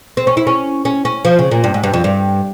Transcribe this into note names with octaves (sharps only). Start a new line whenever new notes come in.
C4
C#4
E4
C#4
C#4
C#4
F3
C#3
A#2
G2
G#2
G2
F2
G2